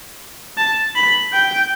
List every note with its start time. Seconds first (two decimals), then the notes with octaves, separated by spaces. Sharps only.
0.58 A5
0.95 B5
1.33 G5